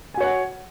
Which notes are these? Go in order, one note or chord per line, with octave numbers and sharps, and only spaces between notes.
F#4 C#5 F#5 G#5